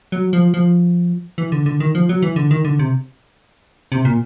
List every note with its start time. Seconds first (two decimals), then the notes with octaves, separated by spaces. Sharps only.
0.12 F#3
0.33 F3
0.54 F3
1.38 E3
1.52 D3
1.66 D3
1.80 D#3
1.95 F3
2.09 F#3
2.22 E3
2.36 D3
2.51 D#3
2.65 D3
2.79 C3
3.92 C3
4.05 A#2